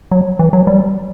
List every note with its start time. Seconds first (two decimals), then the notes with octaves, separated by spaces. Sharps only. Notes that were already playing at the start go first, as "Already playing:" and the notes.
0.11 F#3
0.39 E3
0.53 F#3
0.67 G3